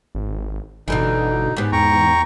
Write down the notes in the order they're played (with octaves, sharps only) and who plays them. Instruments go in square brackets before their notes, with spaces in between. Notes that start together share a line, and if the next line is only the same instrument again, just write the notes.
[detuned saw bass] G#1
[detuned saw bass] G1 [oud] B2 D3 E3 [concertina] D#4
[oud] G#2 B3 [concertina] G4
[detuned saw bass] E2 [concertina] G5 A#5 C#6